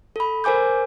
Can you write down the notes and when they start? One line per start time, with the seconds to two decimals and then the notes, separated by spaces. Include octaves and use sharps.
0.16 A4 B5
0.44 A#4 C5 G#5 D6 G6